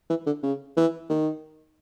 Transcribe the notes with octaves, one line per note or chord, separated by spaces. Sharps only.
E3
D3
C#3
E3
D#3